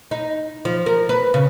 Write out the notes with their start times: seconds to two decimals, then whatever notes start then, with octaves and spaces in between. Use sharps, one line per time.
0.11 D#4
0.65 F3
0.86 A#4
1.09 B4
1.34 C#3